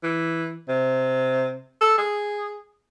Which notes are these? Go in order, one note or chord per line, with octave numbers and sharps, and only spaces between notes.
E3
C3
A4
G#4